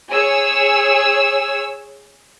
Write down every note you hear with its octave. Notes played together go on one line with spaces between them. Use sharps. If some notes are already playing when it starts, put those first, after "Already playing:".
G#4 C#5 E6